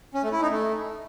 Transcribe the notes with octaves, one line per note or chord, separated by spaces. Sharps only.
C#4
A3
E4
D#4
A3